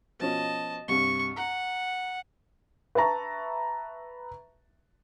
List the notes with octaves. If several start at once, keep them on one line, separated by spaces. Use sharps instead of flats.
B2 F3 C#4 D#5 A5
C2 G2 C3 C#6
F#5 A#5
B4 E5 A5 A#5 C#6